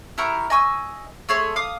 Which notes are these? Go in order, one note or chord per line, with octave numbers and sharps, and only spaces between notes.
E4 G4 A#4 C#6
D#5 G#5 C#6 E6
A3 G#4 C#5 C6
F5 D6 D#6